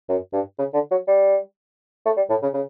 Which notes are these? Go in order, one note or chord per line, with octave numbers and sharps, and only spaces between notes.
F#2
G2
C#3
D3
F#3
G3
A3
G3
A2
C#3
C#3